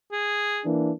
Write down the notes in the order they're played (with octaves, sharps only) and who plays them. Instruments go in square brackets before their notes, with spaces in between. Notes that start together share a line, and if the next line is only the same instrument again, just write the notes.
[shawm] G#4
[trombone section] E3 A#3 D4